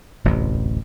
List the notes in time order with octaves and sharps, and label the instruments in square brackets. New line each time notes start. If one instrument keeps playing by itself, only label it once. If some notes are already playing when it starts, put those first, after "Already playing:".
[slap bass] D1 A1 E2 C3